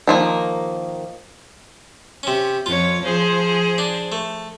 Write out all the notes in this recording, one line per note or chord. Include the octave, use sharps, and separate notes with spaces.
D#3 F3 A#3
C3 C#4
F2 F4 C#5
F3 G#4 C5
D4
A3